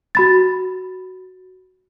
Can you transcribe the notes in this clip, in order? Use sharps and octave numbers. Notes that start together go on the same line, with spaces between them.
F#4 B5 A6